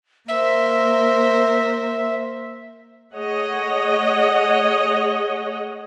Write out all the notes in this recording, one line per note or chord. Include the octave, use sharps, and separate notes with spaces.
A#3 A#4 C5 E5
A3 G#4 C#5 D#5 F#5